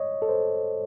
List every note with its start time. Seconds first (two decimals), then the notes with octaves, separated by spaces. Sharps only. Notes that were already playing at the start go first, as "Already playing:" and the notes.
Already playing: C#5 D#5
0.22 A4
0.29 C5